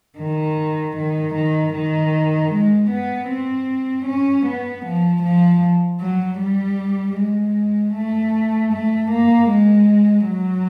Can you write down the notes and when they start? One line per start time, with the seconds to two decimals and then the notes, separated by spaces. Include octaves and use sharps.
0.19 D#3
0.97 D#3
1.35 D#3
1.74 D#3
2.51 G#3
2.91 B3
3.29 C4
4.06 C#4
4.46 B3
4.85 F3
5.22 F3
6.01 F#3
6.40 G3
7.17 G#3
7.95 A3
8.72 A3
9.11 A#3
9.49 G#3
10.27 F#3